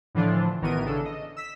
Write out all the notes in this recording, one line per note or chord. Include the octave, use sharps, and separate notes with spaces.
A2 D3 E3 F3 D4 F4
A1 D#3 E3 B3 A#4 D#7
C#3 D4 A4
D#5
E6 B6